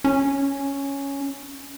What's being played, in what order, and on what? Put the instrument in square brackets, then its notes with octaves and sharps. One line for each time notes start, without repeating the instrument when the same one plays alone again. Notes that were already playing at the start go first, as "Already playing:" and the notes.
[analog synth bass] C#4